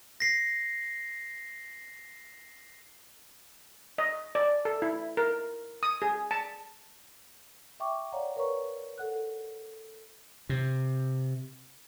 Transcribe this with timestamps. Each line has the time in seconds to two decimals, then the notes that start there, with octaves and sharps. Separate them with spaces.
0.20 A#6 C7
3.98 D#5
4.35 D5
4.65 A4
4.82 E4
5.17 A#4
5.83 D#6
6.02 G#4
6.31 A5
7.80 E5 G5 C#6 D6
8.12 C#5 D5 F5 F#5 A#5
8.36 A#4 B4 C#5 A#5 C#6
8.98 A4 F#5 F#6
10.49 C3